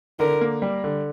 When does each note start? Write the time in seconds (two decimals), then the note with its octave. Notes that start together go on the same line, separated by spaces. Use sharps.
0.20 D3 A#4
0.41 A#3
0.62 G3
0.84 D3